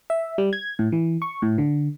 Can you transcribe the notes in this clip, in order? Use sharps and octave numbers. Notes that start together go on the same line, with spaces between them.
E5
G3
G#6
A2
E3
C#6
A2
D3